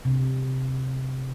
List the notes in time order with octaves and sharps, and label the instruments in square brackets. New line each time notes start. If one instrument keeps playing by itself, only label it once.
[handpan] C3